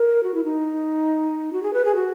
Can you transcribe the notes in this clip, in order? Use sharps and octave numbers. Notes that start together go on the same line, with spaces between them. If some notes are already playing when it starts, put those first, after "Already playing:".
Already playing: A#4
F#4
E4
D#4
F#4
G#4
B4
G#4
F#4